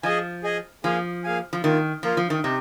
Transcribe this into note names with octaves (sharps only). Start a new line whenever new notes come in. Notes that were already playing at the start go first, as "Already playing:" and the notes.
F3 G#4 D#5 G#5
G#4 D#5 G#5
F3 A#3 G#4 F5 G#5
A#3 G#4 F5 G#5
F3
D#3 A#3 F4 A#4
F3 A#3 F4 A#4
F3
D#3
C3 D#4